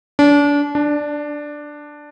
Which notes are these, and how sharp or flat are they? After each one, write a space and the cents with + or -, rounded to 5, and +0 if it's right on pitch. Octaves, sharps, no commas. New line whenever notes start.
D4 -30
D4 +5